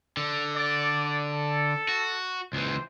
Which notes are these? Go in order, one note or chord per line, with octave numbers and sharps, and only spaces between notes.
D3
D5
A4
F#4
C#2 E3 C5